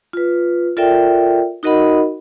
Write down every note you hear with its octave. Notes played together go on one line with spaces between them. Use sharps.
F4 B4
F4 A4 A#4 D5 E5 G5
D#4 F#4 A#4 D#5 F#5 B5